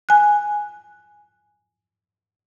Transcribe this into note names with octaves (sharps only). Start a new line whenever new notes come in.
G#5 F#6